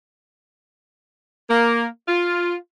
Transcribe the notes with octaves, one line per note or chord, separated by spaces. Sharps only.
A#3
F4